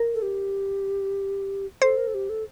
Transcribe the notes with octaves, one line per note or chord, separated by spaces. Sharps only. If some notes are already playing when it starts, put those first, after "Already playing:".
Already playing: A#4
A4
G4
A4 C5
A#4
A4
G4
A4